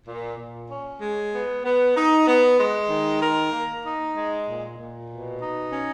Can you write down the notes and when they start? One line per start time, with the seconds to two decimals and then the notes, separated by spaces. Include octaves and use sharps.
0.07 A#2
0.39 A#2
0.69 C#4
1.01 G#3
1.32 B3
1.64 B3
1.96 D#4
2.27 B3
2.59 G#3
2.90 D#3
3.21 A#4
3.53 A#3
3.84 D#4
4.15 G#3
4.46 A#2
4.77 A#2
5.09 B2
5.40 D#4
5.72 C#4